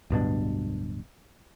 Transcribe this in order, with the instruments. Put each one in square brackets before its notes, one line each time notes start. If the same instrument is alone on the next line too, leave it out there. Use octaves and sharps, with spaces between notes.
[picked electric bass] D1 G2 B2 D4